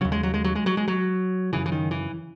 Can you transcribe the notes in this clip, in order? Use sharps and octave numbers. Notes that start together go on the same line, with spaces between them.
D#2 C#3 F#3
G#3
F#3
G#3
F#3
G#3
F#3
G#3
F#3
F#2 C#3 E3
E3
D#3
E3